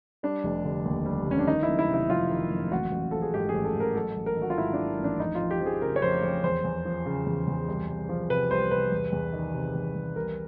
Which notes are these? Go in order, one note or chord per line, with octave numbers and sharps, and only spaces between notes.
G3 D4
F1
D3
D#2
G3
F1 C#4
D4
D#3 D#4
E4
F#1
E4
C3
E4
F2 F4
D#3
F#1
A1 F#4
A1
F3 A4
G#4
G#2 G4
G#4
A1
A4
A1
A#4
F#3 A4
A1
A#4
D#3
F#4
F4
G#2 E4
D4
F#3
A1
D4
F2 D#4
F4
F2
G4
F3
G#4
C#3 A#4
C#5
F2 C5
F2 C#5
E2 C5
E2
F3
C#3
E2
E2
C2
C2
F3
C3 B4
C2 C5
C2 B4
E2
E2
D#3
C3
E2
E2
C2 A#4